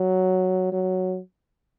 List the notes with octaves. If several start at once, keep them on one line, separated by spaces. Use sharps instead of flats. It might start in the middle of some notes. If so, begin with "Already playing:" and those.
Already playing: F#3
F#3